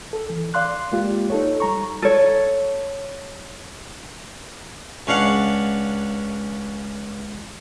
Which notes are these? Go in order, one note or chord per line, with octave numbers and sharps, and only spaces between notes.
A4
E3
D5 F5 C6 F#6
G#3 A#3 F4 G4
D#4 A4 C#5
G3 A#5 C#6
A4 C#5
C#2 C#4 D4 F5 F#5